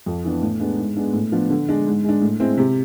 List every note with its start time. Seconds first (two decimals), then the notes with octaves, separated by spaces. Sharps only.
0.06 F2
0.24 E3 B3 D4
0.42 A2
0.60 G#3 B3 D4
0.77 G#2
0.96 G#3 B3 D4
1.13 A2
1.32 F3 B3 D4
1.50 D3
1.69 G#3 D4
1.87 G#2
2.04 G#3 D4
2.22 A2
2.40 G#3 C4 E4
2.57 C3